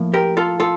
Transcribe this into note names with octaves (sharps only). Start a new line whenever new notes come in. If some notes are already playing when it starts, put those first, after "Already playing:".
Already playing: A2 F3 A#3
G4 A#4
F4 A4
F4 A4